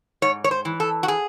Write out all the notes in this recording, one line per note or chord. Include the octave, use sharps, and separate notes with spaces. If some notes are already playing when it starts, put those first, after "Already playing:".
G#2 C#5
C#5
C5
E3
A4
F#4
G#4